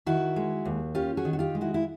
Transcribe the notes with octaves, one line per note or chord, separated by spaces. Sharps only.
D#3 E4 F#4
G#3
D#2
C#4 F4 G4
F#4 G#4
D#3
F#4
F4 G4
G#3
E4 F#4
E4